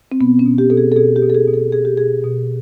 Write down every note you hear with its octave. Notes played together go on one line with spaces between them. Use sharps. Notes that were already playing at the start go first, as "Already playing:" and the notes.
C4
B2 B3
C#4
B2
G4
B2 A4
G#4
A4
B2 G#4
G4
B2
A4
G#4
B2
A4
B2 G#4
G4
B2 G#4
B2